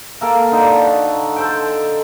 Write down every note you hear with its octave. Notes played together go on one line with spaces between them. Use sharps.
A#3 A4 A#4 F5
D3 D#4 A4
F#4
A4 C5 G5